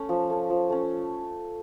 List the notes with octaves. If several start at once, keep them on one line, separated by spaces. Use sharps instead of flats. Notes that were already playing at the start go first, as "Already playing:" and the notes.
Already playing: A3 C#4
F3
A3 C#4
F3
A3 C#4